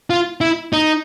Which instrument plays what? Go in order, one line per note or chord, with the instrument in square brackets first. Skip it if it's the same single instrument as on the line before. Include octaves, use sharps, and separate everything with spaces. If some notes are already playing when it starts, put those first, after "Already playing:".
[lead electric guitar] F4
E4
D#4